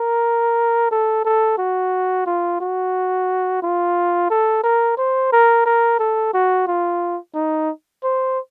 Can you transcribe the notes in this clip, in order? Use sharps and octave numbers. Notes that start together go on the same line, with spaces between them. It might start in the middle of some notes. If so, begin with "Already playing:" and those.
Already playing: A#4
A4
A4
F#4
F4
F#4
F4
A4
A#4
C5
A#4
A#4
A4
F#4
F4
D#4
C5